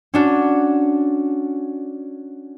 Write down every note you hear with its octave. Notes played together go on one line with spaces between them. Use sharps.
C#4 D4 F#4